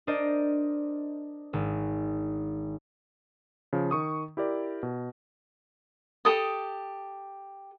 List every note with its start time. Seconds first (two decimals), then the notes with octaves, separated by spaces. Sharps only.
0.07 D4 A#4 C5 D5 D#5
1.53 G#1
3.73 C#3 F3
3.91 D#3 C#6 D#6
4.37 E4 G4 A#4 D5
4.83 B2
6.25 G4 A4 D#6